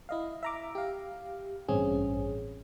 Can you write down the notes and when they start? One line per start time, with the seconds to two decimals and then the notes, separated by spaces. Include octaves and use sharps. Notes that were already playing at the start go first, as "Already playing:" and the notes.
0.09 E4 D#5 F5
0.43 E5 A#5 D6
0.75 G4 F5
1.68 A1 G2 C4 C#4 G#4